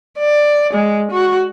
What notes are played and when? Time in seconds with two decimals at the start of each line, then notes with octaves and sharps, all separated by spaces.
0.18 D5
0.73 G#3
1.11 F#4